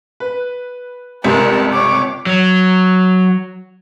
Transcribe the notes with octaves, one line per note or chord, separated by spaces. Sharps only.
B4
G1 C#2 C3 A#4 A5
C#5 D6
F#3